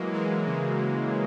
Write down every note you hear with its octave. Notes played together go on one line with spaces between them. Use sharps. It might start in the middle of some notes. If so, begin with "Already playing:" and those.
Already playing: E3 F#3 G#3 A#3
E3 G#3
C#3 E3